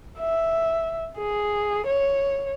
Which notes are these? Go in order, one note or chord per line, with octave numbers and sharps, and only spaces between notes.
E5
G#4
C#5